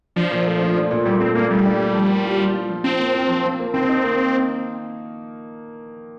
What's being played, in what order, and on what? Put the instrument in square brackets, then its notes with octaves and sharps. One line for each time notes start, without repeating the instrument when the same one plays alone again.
[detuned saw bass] F3 [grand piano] D4
[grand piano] A#2
A3
D4
D4
A#2
[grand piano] A#2 [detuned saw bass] G3
[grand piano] A3 [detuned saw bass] C4
[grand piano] A#2 [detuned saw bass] A#3
[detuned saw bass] G3 [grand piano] A3
[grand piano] D4
D4
F3
A#3
F4
F4
F4
F3
[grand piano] F3 [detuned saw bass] C4
[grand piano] A#3
F4
F3
F3
A#3
[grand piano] D#3 [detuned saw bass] C4
[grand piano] D#4
A#3